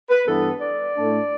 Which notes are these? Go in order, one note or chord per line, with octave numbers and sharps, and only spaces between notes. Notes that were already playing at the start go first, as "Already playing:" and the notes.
B4
G2 E3 B3 D4 A4
D5
A2 A3 D4